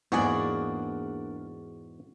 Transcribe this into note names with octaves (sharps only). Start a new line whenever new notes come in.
E2 G#2 A#3 D4 F#4 G#4 D5